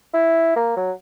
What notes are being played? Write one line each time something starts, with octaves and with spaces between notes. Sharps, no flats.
E4
A#3
F#3